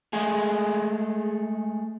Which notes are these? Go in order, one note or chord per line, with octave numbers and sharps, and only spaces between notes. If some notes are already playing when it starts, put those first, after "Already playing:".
G#3 A3 G#4